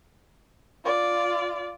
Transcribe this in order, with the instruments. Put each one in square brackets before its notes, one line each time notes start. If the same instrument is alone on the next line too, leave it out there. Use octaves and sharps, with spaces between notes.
[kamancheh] F4 D5